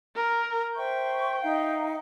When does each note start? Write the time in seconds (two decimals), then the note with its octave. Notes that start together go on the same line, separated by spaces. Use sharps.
0.16 A#4
0.76 C5 E5 G5 C#6
1.42 D#4 E5 F5